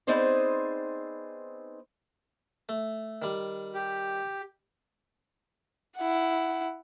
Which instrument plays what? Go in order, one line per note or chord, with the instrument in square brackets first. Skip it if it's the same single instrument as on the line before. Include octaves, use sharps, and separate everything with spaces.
[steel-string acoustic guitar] B3 C4 D#4 G#4 C5 D5
[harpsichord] A3
D#3 G3
[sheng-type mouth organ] G4
[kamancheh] E4 F#5